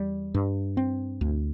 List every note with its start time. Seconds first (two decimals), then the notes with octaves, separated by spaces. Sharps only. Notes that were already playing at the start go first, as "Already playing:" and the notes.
Already playing: E2 G3
0.34 G2
0.77 C4
1.21 D2